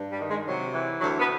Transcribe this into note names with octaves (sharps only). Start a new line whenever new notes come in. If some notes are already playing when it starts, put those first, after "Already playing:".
Already playing: G2
G3
D#3
G#3
C3 F#3
E3
D2 F#3
B3